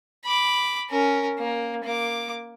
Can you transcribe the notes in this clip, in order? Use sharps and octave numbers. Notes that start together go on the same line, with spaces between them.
B5 D6
C#4 A#4
A#3
A#3 D6